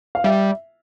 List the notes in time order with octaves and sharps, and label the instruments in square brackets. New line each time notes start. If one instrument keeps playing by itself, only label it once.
[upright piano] F5
[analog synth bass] G3 [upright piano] E5